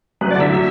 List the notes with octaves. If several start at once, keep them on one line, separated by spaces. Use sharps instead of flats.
F#2 B4
D5
D3 E5
F#3 E5